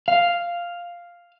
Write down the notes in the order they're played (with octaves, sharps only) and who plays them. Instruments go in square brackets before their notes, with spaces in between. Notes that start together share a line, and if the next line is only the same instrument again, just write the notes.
[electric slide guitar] F5